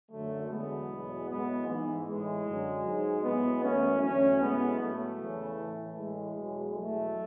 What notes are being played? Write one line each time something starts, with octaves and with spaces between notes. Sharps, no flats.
F#2 D3 F#3 A3
E2 D3 F#3 G#3 B3
E2 B2 F#3
A2 F#3 G#3 B3
G#2 E3
A2 E3 G#3
F#2 D3 F#3
G#2 F#3
A2 F#3 G#3 B3
F#2 E3 A3 C#4
E2 D3 F#3 A3 C#4
A2 F#3 G#3 B3
A2 F#3 A3
E2 C#3 E3
A2 E3
A2 E3 G#3
E2 B2 F#3
E2 B2 F#3 A3